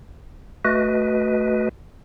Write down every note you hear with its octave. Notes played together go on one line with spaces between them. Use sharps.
A3 F#4 B4 D#5